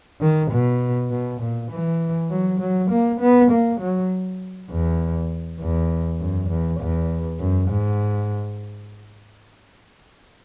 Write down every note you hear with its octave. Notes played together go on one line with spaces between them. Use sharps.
D#3
B2
B2
A#2
E3
F#3
F#3
A#3
B3
A#3
F#3
E2
E2
F#2
E2
E2
F#2
G#2